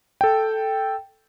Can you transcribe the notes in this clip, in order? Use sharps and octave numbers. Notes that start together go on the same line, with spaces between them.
A4 G5